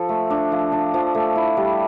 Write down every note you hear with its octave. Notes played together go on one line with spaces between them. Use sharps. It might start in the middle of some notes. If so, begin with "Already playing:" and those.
Already playing: F3 A4
A3
D4
F3
D4
F3
A3
E4
G3